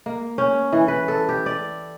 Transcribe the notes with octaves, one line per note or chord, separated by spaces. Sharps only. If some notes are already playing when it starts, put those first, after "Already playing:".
A#3
C#4
E3
B4
A4
G4
D5